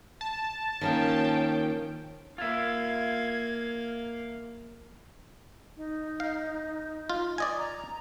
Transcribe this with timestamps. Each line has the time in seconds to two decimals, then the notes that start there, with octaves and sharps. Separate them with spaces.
0.21 A5
0.81 D#3 F3 A#3 C#4 G5
2.38 A#3 F4 E5 F5 G#6
5.77 D#4
6.20 F5
7.10 F4
7.38 D5 D#5 G#5
7.58 A#5